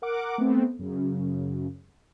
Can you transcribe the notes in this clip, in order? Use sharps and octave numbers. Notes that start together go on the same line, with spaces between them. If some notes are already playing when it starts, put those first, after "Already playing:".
A#4 F#5 D6
A3 B3 C4
F#2 C#3